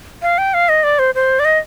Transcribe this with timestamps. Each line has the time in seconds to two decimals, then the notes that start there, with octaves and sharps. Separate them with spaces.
0.22 F5
0.38 G5
0.54 F5
0.69 D#5
0.84 D5
0.99 C5
1.15 C5
1.39 D5
1.45 D#5